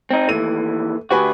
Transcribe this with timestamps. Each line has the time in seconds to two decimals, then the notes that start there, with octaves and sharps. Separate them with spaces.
0.11 C4 D#4
0.28 D#2 E3 A3 D#7
1.11 D2 F#4 G4 B4 G#5